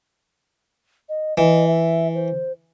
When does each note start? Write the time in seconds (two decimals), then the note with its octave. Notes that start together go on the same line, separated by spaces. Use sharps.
1.09 D#5
1.38 E3 D#5
1.68 E5
2.15 C5